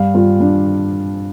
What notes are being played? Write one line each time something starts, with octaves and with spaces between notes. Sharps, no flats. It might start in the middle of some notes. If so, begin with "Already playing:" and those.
Already playing: G2 F5
G2 F4
G2 D4